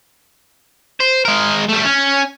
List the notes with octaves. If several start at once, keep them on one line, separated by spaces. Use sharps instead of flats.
C5
G#3 A#4
G3 A3
C#4